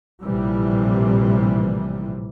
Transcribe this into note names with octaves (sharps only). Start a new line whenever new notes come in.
A#1 A2 C3 E3 G3